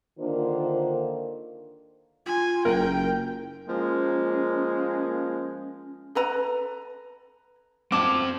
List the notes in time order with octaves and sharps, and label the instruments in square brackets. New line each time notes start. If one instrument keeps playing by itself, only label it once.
[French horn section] D3 D#3 A#3 D4 F4 C5
[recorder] F4 [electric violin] G#5
[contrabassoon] F#1 [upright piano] A#4 [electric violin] G5
[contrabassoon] F3 [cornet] G#3 [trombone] A#3 [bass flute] C#4
[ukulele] A4 B4 A#5
[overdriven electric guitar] C4 A5 [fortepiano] D6